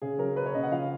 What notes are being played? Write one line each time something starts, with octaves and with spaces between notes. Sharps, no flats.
C#3 G#4
F#3 A#4
C#4 B4
C#5
C#3 D#5
F#5
F3 F5